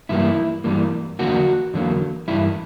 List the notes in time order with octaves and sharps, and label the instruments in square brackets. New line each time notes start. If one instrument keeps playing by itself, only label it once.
[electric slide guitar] G2 E3 G3 A#3 E4
G2 E3 G3 A#3
E2 D3 F#3 A#3 F#4
E2 D3 F#3 A#3
G2 E3 G3 E4